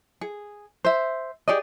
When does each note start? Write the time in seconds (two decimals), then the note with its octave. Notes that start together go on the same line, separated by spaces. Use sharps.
0.21 G#4
0.85 C5 E5
1.48 G4 G#4 D5 D#5